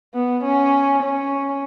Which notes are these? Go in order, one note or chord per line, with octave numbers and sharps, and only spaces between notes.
B3
C#4
C#4